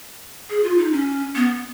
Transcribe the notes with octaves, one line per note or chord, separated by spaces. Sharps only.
G#4
F4
D#4
C#4
B3